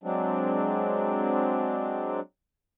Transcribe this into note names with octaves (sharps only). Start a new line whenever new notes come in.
F#3 G#3 C4 D4